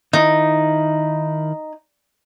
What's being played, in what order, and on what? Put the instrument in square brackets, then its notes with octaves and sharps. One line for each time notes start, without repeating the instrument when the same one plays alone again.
[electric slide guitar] D#3 E4 [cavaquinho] D#4